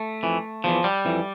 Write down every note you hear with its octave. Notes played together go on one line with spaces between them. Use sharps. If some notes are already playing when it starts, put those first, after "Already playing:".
Already playing: A3
F2 E3
E2 E3 F3
G3
F2 E3